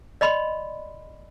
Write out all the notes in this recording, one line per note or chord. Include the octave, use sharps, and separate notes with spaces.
D5 D#5 B5 C6